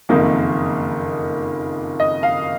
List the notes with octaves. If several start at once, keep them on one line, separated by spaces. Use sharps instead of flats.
F#1 F2 D#3 A#3 D#4
D#5
F5